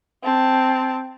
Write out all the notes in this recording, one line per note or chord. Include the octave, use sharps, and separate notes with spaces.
C4 A5